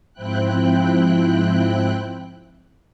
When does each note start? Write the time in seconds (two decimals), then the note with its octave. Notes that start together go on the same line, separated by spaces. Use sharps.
0.13 G#2 F3 C4 E4 G5 F#6